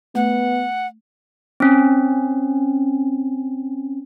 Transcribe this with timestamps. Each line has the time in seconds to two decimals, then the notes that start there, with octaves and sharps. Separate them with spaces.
0.15 A3 B3 F#5
1.60 C4 C#4